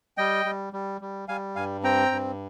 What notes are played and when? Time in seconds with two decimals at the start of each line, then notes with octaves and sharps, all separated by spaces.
0.17 G3 D#5 G5
0.45 G3
0.73 G3
1.01 G3
1.28 G3 F5 G#5
1.56 G2 F5 G#5
1.83 C4 G5 A#5
2.11 G2